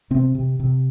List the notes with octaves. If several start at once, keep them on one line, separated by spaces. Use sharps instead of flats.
C3 C4
C3
C3